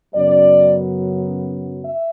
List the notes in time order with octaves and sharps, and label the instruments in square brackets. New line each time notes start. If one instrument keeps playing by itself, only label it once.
[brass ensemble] F#2 C#3 F#3 B3 D5
E5